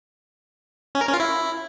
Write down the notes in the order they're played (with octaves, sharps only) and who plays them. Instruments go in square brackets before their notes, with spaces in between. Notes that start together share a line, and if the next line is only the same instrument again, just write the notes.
[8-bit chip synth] C#4
A#4
C#4
F4
E4